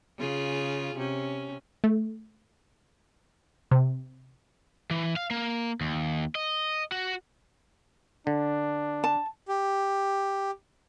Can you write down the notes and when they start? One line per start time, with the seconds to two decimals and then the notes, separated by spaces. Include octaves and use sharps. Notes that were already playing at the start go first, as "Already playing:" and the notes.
0.18 C#3 F4 G#4
0.95 C3 C#4
1.84 A3
3.71 C3
4.91 E3
5.16 F5
5.31 A#3
5.81 D#2
6.35 D#5
6.92 F#4
8.27 D3 D4
9.04 A5
9.48 G4